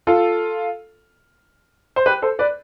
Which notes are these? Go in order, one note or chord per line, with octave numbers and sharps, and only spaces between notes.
F4 A4
C5
G4 B4
A4 C5
B4 D5